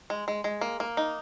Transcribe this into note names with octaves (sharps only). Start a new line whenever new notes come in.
G#3
G#3
G#3
A#3
A#3
D#4